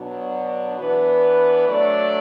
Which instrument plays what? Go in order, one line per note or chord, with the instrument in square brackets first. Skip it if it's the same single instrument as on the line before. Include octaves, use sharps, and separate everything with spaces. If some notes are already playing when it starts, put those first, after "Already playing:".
Already playing: [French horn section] B2 F#3 D4
E3 B3 D4 B4
F#3 A3 D4 A4 D5